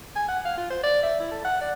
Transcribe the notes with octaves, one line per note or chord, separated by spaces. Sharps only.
G#5
F#5
F5
F4
C5
D5
E5
E4
A4
F#5
D5